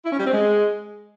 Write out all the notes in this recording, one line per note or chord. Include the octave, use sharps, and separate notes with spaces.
E4
C#4
G3
C4
G#3